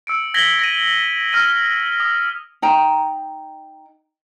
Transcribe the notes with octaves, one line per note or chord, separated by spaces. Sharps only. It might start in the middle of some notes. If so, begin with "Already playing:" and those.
E6 C#7 D7
G#6 A#6 B6 F#7 G7
A#6 D#7
E6 F6 A#6 D#7
D#6
D#4 G5 A#5